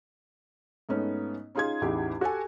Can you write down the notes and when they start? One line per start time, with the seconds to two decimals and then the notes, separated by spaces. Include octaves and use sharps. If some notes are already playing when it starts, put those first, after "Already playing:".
0.89 G#2 A3 B3 C#4 D#4
1.55 C#4 D#4 F4 G#4 C6 G#6
1.81 A1 E2 D#4 E4 G4 G#4
2.21 F#4 G4 A4 G#5